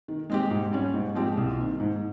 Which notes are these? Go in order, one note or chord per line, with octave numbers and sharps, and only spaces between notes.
D#3
G#3 C4 G4
G#2
G3 C#4
G#2
F3 G#3 C4 G4
C2
C3 D#3
G#2